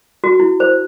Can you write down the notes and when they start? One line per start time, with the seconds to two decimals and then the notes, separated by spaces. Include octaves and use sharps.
0.24 F#4
0.40 E4
0.60 C5